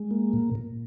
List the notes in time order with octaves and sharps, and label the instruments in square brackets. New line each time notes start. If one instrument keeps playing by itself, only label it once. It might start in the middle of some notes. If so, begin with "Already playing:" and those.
Already playing: [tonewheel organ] G#3
A#3
A#2
A#2